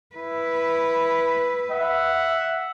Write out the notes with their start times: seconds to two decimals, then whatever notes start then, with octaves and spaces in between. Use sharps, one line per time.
0.16 E4 B4
1.71 E5 F#5